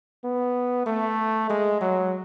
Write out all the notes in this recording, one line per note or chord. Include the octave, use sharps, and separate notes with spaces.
B3
A3
G#3
F#3